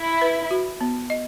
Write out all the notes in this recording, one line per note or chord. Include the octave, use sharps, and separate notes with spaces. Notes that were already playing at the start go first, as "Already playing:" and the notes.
Already playing: E4
B4
F#4
B3
D#5